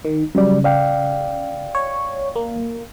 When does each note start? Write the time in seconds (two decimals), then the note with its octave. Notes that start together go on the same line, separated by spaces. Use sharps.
0.05 D#3
0.35 C#3 F#3 G3 D5
0.64 D5 F5 G5
1.75 C#5
2.36 A#3